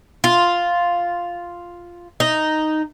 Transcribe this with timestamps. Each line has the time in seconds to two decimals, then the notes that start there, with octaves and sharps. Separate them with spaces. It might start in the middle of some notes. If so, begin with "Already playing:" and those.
0.24 F4
2.20 D#4